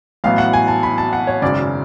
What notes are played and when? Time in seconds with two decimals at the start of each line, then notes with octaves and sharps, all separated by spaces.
0.24 A1 A2 F#3 B3 F5
0.38 F#5
0.53 G#5
0.68 A5
0.83 B5
0.98 A5
1.13 F#5
1.27 C#5
1.42 G#1 F#2 C#3 D5